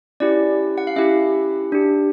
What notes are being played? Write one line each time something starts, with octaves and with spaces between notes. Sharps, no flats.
C#4 E4 G4 D5
F#5
F5
C#4 E4 G4 E5
D4 G4